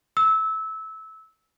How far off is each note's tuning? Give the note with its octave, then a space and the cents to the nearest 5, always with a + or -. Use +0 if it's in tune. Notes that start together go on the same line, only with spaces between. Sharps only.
E6 -20